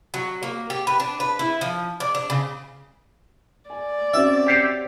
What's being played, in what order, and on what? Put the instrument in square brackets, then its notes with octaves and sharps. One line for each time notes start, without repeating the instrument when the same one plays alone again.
[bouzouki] F#3
A#3
G4
B4
D4
B4
E4
F3
D5
D4
C#3
[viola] D5 [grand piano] G#5
[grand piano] C4 C#4 F#4 [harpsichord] E5
[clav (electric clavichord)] G4 C5 C#5